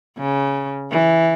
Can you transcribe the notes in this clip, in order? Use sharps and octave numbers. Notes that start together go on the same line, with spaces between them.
C#3
E3